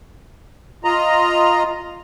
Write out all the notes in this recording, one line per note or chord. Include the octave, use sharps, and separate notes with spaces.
F4 D#5 A#5